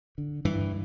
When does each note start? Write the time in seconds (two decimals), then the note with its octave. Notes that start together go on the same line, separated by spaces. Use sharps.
0.18 D3
0.45 G2 E3